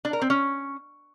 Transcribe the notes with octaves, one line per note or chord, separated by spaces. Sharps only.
D4
A#4
C4
C#4